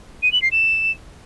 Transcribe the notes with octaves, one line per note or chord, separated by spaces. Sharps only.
D#7
F#7
C7
E7